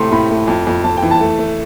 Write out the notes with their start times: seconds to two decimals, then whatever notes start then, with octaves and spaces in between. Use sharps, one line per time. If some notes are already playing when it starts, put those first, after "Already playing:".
Already playing: A2 C3 A3 C6
0.12 A2 B5
0.31 A3
0.48 F2
0.67 F2
0.84 F2 A5
0.97 G5
1.02 E3
1.11 A5
1.21 A3
1.39 A3